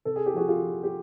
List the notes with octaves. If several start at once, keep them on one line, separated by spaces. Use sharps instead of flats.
C3 A4
G#4
G4
F3 F#4 G#4
F4 G4
F3
G4